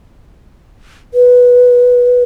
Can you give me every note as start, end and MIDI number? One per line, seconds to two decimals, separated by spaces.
1.14 2.23 71